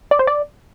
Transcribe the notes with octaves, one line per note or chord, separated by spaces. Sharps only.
D5
C5
D5